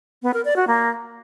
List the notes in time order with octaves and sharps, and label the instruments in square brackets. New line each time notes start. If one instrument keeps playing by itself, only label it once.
[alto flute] B3
A#4
D5
F#4
A#3